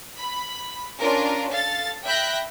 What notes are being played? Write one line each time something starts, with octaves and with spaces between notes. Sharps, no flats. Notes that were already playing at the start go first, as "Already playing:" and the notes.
B5
C#4 D4 F4 A#4
A4 F5 A6
E5 G5 B5 F#6 G6 A#6